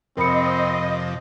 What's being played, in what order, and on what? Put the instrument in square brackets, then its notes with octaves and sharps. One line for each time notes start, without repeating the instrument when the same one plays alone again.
[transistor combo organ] F2 C3 [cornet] C4 [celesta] A#4 B5 C#7 [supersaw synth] D#5